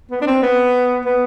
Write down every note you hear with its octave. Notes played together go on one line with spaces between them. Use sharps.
B3
D4
C4
B3
B3